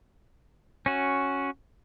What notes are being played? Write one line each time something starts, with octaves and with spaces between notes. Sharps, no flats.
C#4 F#4